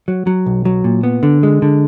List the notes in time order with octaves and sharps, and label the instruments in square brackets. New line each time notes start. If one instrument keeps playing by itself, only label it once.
[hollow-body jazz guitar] F#3
F#3
B1
F#3
A#2
B3
D3
G#3
D3